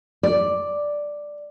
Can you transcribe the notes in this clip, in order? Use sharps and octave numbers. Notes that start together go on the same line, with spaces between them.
D5